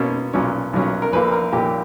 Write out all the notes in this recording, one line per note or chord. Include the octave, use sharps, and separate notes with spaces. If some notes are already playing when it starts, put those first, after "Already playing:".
Already playing: B2 A#3 C#4
B1 A#2 F#3 C#4
B1 A#2 F#3 C#4
A#4
A#1 A#2 A#3 B4
A#4
A#1 A#2 A#3 G4